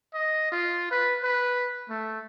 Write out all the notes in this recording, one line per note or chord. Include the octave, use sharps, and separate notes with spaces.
D#5
F4
B4
B4
A3